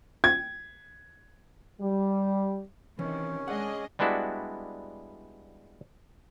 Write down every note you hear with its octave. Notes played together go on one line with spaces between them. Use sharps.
G#6
G3
C3 D#3 E3 C#4
G#3 D4 G#4 D#5 F#5
G3 G#3 B3 D4 E4 F#4